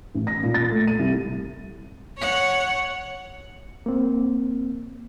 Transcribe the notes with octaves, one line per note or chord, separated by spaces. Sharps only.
A1
A#6
A#2
A6
A3
D#7
C2
C#5 F#5
A#3 C4